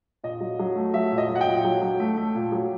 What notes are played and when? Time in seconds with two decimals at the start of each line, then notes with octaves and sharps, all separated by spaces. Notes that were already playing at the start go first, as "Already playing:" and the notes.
0.23 A#2 D#5
0.41 F#3
0.59 F#3
0.76 A3
0.94 F#3 E5
1.11 A#2
1.18 D#5
1.29 F#3
1.35 F#5
1.41 G5
1.47 A#2
1.65 F#3
1.82 F#3
2.00 A3
2.17 A3
2.35 A#2
2.52 F#3